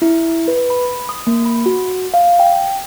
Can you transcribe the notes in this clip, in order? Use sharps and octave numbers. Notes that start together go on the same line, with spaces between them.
E4
B4
B5
D#6
A#3
B5
F#4
F5
G5